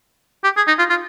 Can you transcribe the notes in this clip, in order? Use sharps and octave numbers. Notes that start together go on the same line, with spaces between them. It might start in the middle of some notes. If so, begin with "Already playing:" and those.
G4
G#4
D#4
F4
F4